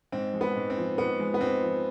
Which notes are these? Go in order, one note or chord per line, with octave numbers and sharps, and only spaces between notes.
G#2 C4
G#3
B3
G#2
C4
F3
G#2 B3
G#3
B3
G#2 C4
F3